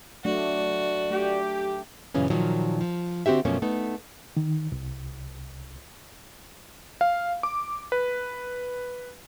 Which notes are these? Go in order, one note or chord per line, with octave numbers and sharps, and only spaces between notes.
F#3 A3 D4 F#4 D5
A3 G4
F#2 A#2 C#3 E3 C#4
A#2 D#3 F3 F#3
F3
D3 C4 F#4 G4 E5
F#2 B2 F3 A3 A#3 C#4
A3 B3 D#4
D#3
C2
F5
D6
B4